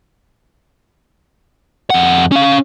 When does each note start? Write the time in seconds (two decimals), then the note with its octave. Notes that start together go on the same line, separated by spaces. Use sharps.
1.90 F2 F#5
2.32 C#4 F5